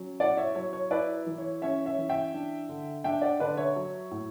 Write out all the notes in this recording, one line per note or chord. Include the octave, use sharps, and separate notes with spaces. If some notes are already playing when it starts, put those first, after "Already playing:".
Already playing: F#3 C#4
E4 D5 F#5
C#5 E5
F#3 C#5
C#5
E4 B4 D5
E3
C#5
C#4 C#5 E5
C#5 E5
E3
E5 G5
D4
D3
D4 E5 G5
D5 F#5
D3 B4 D5
C#5 E5
F#3
A2